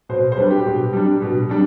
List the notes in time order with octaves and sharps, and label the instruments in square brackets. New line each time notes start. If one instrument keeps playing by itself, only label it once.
[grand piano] B2 C5
C5
G3 D4 B4
G4
B2
G3 D4
B2
G3 D4